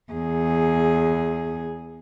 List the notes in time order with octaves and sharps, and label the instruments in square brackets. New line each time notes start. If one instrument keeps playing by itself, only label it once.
[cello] E2 G#4